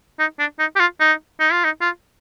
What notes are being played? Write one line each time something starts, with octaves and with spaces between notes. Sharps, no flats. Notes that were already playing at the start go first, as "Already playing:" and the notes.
D#4
D4
D#4
G4
F4
D#4
D#4
F4
D#4
F4